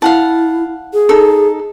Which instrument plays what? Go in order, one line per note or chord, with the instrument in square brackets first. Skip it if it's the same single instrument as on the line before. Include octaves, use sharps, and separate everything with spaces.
[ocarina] E4 [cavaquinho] F5 F#5 A5
[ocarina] G#4
[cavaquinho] D#4 A4